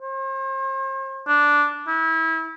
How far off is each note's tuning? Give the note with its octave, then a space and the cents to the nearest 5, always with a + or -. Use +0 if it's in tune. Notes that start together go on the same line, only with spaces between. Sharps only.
C5 +40
D4 -5
E4 -30